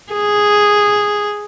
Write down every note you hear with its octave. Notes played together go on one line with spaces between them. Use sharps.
G#4